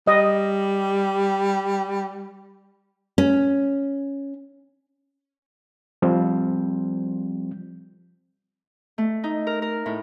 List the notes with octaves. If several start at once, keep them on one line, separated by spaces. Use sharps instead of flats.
G3 D#5
C#4
F3 G3 C4
A3
D#4
A#4
A#4
A2